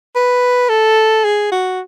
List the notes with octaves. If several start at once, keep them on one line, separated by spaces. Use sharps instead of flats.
B4
A4
G#4
F#4